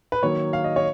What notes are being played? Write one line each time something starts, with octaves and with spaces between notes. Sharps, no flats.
B4
D#3 F#3 A#3 C#5
F5
D#5
C#5